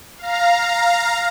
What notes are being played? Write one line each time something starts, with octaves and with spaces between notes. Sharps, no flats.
F5 A#5